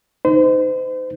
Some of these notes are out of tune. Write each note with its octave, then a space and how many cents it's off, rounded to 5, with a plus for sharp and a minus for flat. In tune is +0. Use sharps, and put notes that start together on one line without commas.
D#4 +0 C5 -35